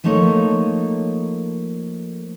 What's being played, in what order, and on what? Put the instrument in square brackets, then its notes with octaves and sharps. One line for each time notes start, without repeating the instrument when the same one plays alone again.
[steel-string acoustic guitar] F3 A3 A#3 D#4 C#5